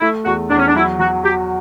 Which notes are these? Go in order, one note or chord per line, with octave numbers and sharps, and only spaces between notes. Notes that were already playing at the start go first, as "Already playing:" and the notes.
A3 E4
E2 F#4
E2 D4
C#4
D4
F#3 E4
F#3 F#4
F#4 G4